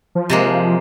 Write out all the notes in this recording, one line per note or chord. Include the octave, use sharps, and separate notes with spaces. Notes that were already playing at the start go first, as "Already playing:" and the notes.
F3
C3 G#3 A#3